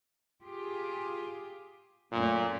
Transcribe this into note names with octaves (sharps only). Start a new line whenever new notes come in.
F4 G4 G#4
F#2 A#2 A3 C#4